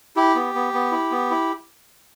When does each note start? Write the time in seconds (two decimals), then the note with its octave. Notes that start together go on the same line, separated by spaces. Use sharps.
0.16 E4 G4
0.35 B3
0.55 B3
0.74 B3
0.91 E4
1.11 B3
1.30 E4